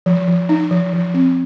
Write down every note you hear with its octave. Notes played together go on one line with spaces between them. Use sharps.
F3
F3
D#4
F3
F3
C4